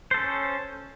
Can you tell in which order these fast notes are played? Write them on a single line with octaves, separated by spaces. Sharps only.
C5 A4 C#4